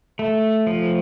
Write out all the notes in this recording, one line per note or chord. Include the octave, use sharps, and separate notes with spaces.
A3
F3